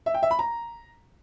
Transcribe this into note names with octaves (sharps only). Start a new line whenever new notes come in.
E5
G5
E5
B5
A#5